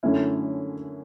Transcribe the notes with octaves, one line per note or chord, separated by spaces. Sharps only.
F#2 D3 A3 C#4 E4